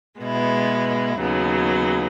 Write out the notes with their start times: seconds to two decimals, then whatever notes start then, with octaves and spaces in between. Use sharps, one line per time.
0.19 B2 G#3 B3 E4
1.19 D#2 C#3 F#3 B3